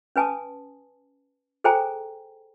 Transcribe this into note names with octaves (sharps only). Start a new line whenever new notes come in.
C#4 B4 G#5 A5 D#6
G#4 A4 C5 G5 G#5 A#5